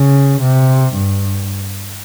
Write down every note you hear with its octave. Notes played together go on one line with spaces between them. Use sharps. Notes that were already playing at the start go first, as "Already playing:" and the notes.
Already playing: C#3
C3
G2